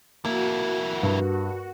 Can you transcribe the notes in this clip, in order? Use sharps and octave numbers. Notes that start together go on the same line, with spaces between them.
F2 A#3 E4 F#4
G2